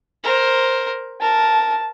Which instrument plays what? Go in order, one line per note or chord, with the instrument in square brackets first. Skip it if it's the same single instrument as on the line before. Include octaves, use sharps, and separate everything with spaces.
[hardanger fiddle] A#4 C5
[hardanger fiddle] A#4 [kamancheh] A5